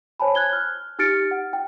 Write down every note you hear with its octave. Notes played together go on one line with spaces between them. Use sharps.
C5 C#5 G#5 A5 B5
F#6 G#6 G7
F6
D#4 G4 F6 A6 C#7 D7
F#5
G5